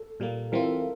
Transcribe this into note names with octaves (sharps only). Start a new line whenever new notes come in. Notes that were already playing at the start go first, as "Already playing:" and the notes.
Already playing: A4
A#2 G3 A#3
E3 G3 C4 F4 A#4
A4